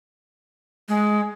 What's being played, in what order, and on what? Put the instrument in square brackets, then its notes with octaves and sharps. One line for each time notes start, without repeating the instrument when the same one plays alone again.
[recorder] G#3